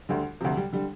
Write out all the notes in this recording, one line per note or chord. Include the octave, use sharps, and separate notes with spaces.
D2 D3 G3
D2 C3 F3
G3
D3 G3